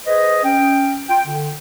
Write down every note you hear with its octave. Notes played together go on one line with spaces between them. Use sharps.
G#4 B4 C5 D#5
C#4 G5
F4 G5
D3